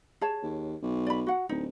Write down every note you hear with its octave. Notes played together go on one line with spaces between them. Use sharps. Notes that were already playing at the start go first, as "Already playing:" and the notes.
G#4 C#5 A5
D#2
B1
D5 B5
F#4 F#5
D1 D#4